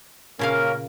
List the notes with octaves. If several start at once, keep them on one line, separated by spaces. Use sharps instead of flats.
A#2 C#3 A#3 C#4 A#4 F5